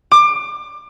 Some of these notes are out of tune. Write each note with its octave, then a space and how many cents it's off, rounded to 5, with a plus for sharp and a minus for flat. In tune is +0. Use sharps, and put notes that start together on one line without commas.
D6 +25